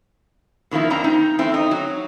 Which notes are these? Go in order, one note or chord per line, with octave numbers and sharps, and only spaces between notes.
B2 D#3 F3 A#3 E4
F2 A#3 C4 D4 A#5
D#4
E2 A3 C4 E4
D#4
F#3